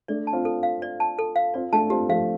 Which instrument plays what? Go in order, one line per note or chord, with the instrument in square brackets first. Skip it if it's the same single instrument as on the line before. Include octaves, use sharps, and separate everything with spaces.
[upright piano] A3 D4 [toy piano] D5
[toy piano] A5
[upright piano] C4 F4
[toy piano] A4
F5
D5
A5
A4
F5
[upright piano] C4 F4 [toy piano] D5
[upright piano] A3 D4 [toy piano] A5
[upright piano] C4 F4 [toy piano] G4
[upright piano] F3 A3 [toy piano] F5